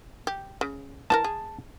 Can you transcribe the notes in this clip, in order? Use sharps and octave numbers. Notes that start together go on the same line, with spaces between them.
G4
C#3
E3 F#4 A#4 A5
G#4